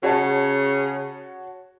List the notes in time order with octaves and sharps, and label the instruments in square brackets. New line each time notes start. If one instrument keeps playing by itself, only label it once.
[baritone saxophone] C#3 [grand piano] F#4 C#5 A5